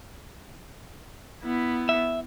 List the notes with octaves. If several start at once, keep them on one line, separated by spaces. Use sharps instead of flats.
B3 E4
E5